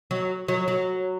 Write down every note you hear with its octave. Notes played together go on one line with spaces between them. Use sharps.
F#3
F#3
F#3